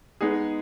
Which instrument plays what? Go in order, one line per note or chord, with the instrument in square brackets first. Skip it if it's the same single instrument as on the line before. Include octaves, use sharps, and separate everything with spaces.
[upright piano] G#3 B3 D#4 G#4